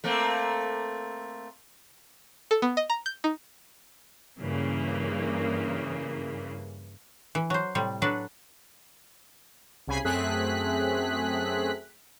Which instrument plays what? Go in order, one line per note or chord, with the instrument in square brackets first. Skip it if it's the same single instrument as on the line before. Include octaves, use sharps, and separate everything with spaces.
[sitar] A3 A#3 C4
[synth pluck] A4
B3
D#5
A#5
G6
D#4
[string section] G2 C#3 E3 A#3
[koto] E3
F#3 C5
A2 C3 G3
F#3 D4 A4 B4
[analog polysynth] C2 C#3 G#5 B5 C7
F#2 A3 C4 G#4 F#6 B6